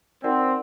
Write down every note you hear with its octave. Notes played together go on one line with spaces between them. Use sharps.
C4 D#4 F#4 A#4 D5 F#5